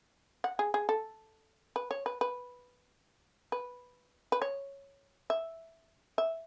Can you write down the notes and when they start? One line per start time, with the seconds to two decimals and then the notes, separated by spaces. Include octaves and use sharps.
0.44 F#5
0.59 G#4
0.74 G#4
0.89 A4
1.76 B4
1.91 C#5
2.06 B4
2.21 B4
3.52 B4
4.32 B4
4.42 C#5
5.30 E5
6.18 E5